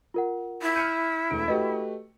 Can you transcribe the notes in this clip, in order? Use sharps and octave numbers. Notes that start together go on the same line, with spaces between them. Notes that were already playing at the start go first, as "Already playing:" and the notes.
F4 A#4 F#5
E4
F6 G6 C#7 D#7
E1 A3 D7
A3 F#4 G4 B4 D#5